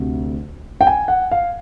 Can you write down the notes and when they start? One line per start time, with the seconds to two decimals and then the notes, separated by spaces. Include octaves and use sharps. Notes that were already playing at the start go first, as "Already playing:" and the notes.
Already playing: D2 C3 A3
0.81 G5
0.87 G#5
1.08 F#5
1.31 F5